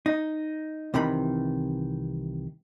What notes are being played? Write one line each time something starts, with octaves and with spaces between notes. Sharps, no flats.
D#4
C2 C3 D#3 E3 B5